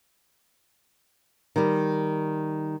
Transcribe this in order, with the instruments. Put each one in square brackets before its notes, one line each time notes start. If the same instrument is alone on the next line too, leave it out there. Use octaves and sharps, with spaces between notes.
[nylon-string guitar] D#3 G3